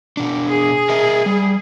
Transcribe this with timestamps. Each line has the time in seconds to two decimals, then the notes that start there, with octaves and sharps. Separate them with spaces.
0.17 B2 D4
0.49 G#4
0.89 A#4 D#5 E5
1.26 G3